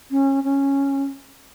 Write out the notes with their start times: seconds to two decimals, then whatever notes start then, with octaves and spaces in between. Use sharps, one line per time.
0.11 C#4
0.44 C#4